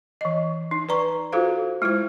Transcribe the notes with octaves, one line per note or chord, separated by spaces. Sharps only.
E3 D#5
D#4
B4 D5 A#5 C#6
F4 F#4 A4 C5 F5
G#3 E4 F4 C5